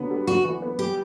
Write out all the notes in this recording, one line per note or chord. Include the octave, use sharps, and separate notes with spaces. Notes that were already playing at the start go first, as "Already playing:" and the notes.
Already playing: D3 F#3 B3
G3
D4 F#4
E3
B3
G3 G4